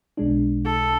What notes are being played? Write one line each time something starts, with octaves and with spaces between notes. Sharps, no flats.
B1 B2 G#3 D4
A4